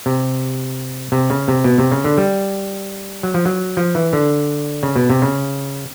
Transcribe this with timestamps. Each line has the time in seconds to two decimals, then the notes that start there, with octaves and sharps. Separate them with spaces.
0.06 C3
1.12 C3
1.30 C#3
1.48 C3
1.64 B2
1.78 C3
1.92 C#3
2.04 D3
2.18 G3
3.23 F#3
3.34 F3
3.45 F#3
3.77 F3
3.95 E3
4.13 D3
4.83 C#3
4.96 B2
5.10 C3
5.22 C#3